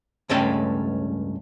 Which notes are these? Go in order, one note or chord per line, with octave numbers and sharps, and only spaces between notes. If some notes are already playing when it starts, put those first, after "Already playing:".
C#2 G2 A3 C#4 A4 G5